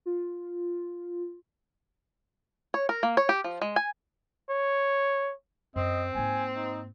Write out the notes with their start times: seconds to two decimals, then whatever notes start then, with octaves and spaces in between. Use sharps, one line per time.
0.06 F4
2.74 C#5
2.89 A#4
3.03 A#3
3.17 C#5
3.29 G4
3.44 F3
3.61 G#3
3.76 G#5
4.50 C#5
5.76 F#2 C4 D#5
6.15 G#2 A#3 G#5
6.55 D#4